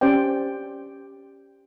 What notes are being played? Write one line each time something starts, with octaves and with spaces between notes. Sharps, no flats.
C#4 G4 C5 D5 G5